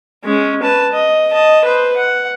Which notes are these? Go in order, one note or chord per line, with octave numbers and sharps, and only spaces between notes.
G#3 C#4
B4 A5
D#5
D#5 A5
B4 C5
F#5